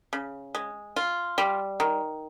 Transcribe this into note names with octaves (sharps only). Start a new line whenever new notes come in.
C#3
G#3
F4
G3
D#3